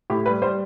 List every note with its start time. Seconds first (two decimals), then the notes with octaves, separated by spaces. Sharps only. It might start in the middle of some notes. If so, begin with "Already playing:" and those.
0.10 A2 G4
0.26 G3 B4
0.42 G3 C5